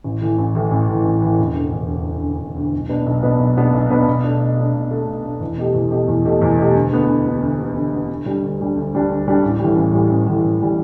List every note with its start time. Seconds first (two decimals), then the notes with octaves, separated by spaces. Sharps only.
0.04 A1
0.21 A2 E3
0.39 A1
0.55 A2 E3
0.71 A1
0.88 A2 E3
1.05 A1
1.22 A2 E3
1.39 E1
1.56 D2 D3
1.73 E1
1.89 D2 D3
2.06 E1
2.23 D2 D3
2.40 E1
2.56 D2 D3
2.73 B1
2.89 B2 B3 D4 B4
3.06 B1
3.23 B2 B3 D4 B4
3.39 B1
3.57 B2 B3 D4 B4
3.73 B1
3.90 B2 B3 D4 B4
4.07 B2
4.24 A3 D4
4.40 B2
4.57 A3 D4
4.74 B2
4.91 A3 D4
5.07 B2
5.25 A3 D4
5.41 E2
5.58 B2 A3 G4
5.74 E2
5.91 B2 A3 G4
6.08 E2
6.25 B2 A3 G4
6.42 E2
6.58 B2 A3 G4
6.75 D2
6.92 D3 B3
7.09 D2
7.26 D3 B3
7.42 D2
7.59 D3 B3
7.75 D2
7.92 D3 B3
8.09 D2
8.26 D3 G3 D4
8.43 D2
8.60 D3 G3 D4
8.76 D2
8.93 D3 G3 D4
9.10 D2
9.27 D3 G3 D4
9.44 A1
9.60 A2 E3 G3
9.76 A1
9.93 A2 E3 G3
10.10 A1
10.27 A2 E3 G3
10.44 A1
10.60 A2 E3 G3